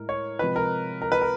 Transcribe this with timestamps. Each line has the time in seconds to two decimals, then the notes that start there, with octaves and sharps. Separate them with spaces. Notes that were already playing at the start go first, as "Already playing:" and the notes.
Already playing: A2 G#3 A#4
0.09 C#5
0.39 C3 F3 G#3 B4
0.56 A#4
1.02 A#4
1.12 B4
1.22 A#4